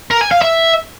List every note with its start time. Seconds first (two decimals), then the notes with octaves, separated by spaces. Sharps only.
0.11 A#4
0.21 G#5
0.31 F5
0.42 E5